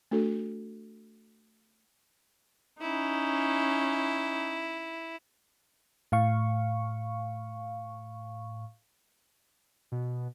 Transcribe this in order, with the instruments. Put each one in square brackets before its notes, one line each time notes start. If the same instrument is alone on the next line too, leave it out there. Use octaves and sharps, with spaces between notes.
[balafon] A3 D4 F#4 A4
[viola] C#4 D#4 [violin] E4
[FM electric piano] A2 F5 C#6
[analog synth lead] B2